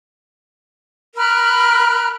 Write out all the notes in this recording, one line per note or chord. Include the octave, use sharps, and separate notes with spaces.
A#4 B5 F6 F#6